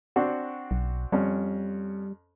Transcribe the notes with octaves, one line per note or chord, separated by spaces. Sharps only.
C4 D4 F#4
B1
F2 G3 C#4